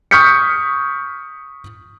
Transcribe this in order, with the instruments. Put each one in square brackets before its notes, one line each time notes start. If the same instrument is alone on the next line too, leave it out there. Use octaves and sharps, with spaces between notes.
[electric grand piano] C#6 D#6 F6 G6 B6 C#7